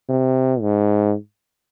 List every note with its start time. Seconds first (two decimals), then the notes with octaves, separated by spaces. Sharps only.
0.09 C3
0.61 G#2